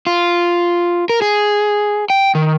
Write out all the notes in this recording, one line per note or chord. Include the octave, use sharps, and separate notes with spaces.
F4
A#4
G#4
G5
D#3